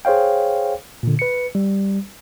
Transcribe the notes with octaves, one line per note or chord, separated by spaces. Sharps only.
G#4 C5 C#5 F5 G5
A#2 D3
B4 C#7
G3